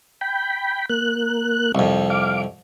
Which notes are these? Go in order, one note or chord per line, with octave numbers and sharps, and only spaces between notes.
G5 B5
A#3 F#6
C2 F2
F5 D6